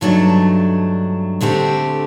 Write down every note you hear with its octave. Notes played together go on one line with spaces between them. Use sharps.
G2 D#3 F#3 A3 D4
D2 D3 A3 C4 G4